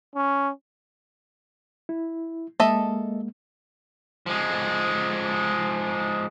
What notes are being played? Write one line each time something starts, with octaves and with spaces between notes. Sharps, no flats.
C#4
E4
G#3 A#3 A4 D#5 E5
F3 G#3